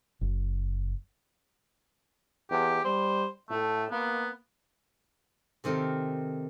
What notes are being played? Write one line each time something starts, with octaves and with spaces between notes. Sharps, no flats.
F#1
E2 G4
G3 C5
A2 A3
A#3 B3
C3 D#3 C4 A4 A#4